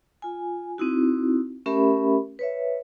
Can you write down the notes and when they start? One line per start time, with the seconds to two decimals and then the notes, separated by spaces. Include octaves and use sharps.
0.22 F4 G#5
0.78 C4 D#4 E4 F#4
1.66 A3 C#4 G4 A#4 E5 B5
2.39 B4 C#5 E5